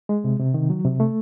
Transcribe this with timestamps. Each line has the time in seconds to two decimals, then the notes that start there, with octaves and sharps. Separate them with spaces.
0.09 G#3
0.24 C3
0.40 C3
0.54 D#3
0.70 F#3
0.85 C3
1.00 A3